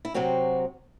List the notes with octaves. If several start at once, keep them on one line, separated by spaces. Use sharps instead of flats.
E4
C3 F#3 C4 F#4